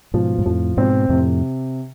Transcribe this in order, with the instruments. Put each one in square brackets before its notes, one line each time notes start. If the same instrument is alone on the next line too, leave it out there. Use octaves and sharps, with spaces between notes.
[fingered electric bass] G#2 B2 [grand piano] F3
[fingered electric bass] G#2
[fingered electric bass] F2 A2 [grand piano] F3
[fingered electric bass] G#2 B2 [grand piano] C4
[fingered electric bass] F2 A2 [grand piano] C3